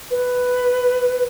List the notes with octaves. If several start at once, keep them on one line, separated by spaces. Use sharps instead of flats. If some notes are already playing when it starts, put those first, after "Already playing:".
B4